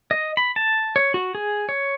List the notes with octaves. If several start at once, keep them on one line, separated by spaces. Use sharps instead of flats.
D#5
B5
A5
C#5
F#4
G#4
C#5